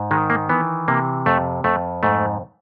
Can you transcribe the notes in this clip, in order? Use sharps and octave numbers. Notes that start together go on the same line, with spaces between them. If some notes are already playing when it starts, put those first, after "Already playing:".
Already playing: G#2
D#3 G#3
A#3
E3 B3
C3 A#3
F2 A3
F2 A3
G#2 A3